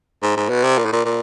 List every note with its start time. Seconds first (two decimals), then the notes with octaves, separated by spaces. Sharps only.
0.23 G#2
0.37 G#2
0.50 B2
0.64 C3
0.78 A#2
0.85 A2
0.92 A#2
1.05 A#2